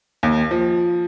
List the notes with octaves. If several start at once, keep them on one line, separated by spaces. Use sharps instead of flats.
D#2
F3